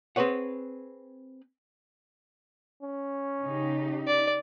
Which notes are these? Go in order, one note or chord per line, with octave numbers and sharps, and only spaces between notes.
C4 G#4 B4 C#5 F#5
C#4
C#3 D#4 G4
D5